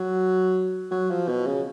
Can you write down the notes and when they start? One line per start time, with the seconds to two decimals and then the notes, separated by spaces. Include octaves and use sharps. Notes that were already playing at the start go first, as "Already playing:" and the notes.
Already playing: F#3
0.91 F#3
1.11 F3
1.28 B2
1.46 C#3